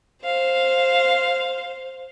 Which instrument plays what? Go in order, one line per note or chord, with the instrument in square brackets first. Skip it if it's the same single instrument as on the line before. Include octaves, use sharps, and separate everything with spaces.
[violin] C5 F5